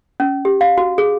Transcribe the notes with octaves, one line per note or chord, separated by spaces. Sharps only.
C#4
G4
F5
F#4
G#4